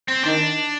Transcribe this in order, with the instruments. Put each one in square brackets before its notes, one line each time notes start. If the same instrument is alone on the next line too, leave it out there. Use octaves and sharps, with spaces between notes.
[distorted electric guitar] C4
[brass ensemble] D#3 [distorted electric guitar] D4